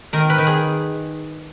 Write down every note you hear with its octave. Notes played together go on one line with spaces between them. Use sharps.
D#3 A#4
B4
D#3
G#4